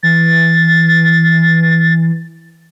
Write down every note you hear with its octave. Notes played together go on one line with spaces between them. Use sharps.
E3 A6